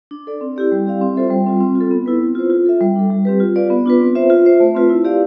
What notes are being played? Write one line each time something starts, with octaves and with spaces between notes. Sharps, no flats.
D4
A4 D5
C4
E4 G4 D5
G3
C4 G4 D5 F5
C4
F4 A4 C5 E5
G3
C4 F4
C4
F4
A4
B3
E4 B4
C4
F4 C5
F4
A4 E5
G3
D4 A4
G3
C4 G4 B4
F4
B4 D5 F5
B3
D4 F4 B4
C4
F4 C5 E5
F4
C5 E5
A3
C4 F4 B4
E4
G4 D5 F5